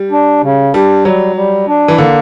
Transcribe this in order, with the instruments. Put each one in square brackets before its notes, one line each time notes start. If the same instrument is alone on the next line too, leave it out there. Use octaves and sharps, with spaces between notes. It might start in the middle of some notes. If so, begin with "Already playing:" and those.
Already playing: [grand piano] G3
[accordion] D4
C#3
[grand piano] G3 [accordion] D4
[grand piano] F#3 [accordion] G3
[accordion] G3
D4
[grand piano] E3
[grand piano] D3 [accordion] A#3